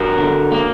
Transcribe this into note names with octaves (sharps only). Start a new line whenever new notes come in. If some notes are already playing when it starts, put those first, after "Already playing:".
Already playing: G2 F#4 A#4
D3
A#3